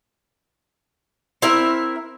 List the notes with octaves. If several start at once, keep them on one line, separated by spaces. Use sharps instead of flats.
C4 E4 A#4 E5